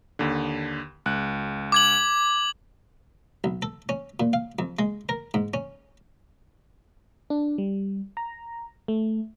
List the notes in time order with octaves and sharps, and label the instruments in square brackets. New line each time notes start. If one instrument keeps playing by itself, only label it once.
[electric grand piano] D#2 D3
C#2 F#6
[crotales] D6 G#6 F#7
[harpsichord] B1
A4
C#4
A#2
F5
F2
G#3
A#4
G#2
C#4
[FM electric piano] D4
G3
A#5
A3